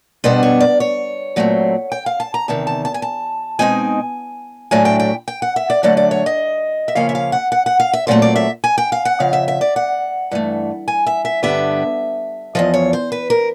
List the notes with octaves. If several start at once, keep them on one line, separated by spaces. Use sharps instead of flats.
B2 G3 B3 D4 C5
C#5
D5
C#5
A#2 F#3 A3 C4
G5
F5
A5
A#5
E2 C3 D#3 A5
A5
A5
G#5
A5
B2 G#3 C4 D#4 G#5
A2 F#3 A3 D4 G#5
G5
G5
G5
F#5
E5
D5
D3 F#3 A3 D5
D5
C#5
D#5
E5
C#3 F3 A#3 C#4 F5
E5
F5
F#5
F#5
F#5
F5
E5
A#2 F#3 A3 C4 C5
D5
E5
G#5
G5
F5
F#5
F2 C#3 F5
E5
E5
D5
F#5
G2 E3 A3
G#5
E5
E5
G2 D3 G3 B3 E5
E2 C3 F3 D#5
C#5
C5
B4
A#4